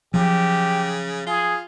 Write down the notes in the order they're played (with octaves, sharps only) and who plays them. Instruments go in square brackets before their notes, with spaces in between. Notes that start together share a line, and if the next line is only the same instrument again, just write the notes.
[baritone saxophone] C#3 [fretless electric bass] F3 F#3 [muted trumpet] G4
[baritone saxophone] F4 [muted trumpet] G#4